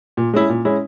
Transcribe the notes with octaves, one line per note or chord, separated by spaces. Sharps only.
A#2
G#3 C#4 E4
A#2
G#3 C#4 E4